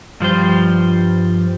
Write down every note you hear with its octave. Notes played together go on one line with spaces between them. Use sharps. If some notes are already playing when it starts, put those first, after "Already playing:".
G2 F3 G3 C5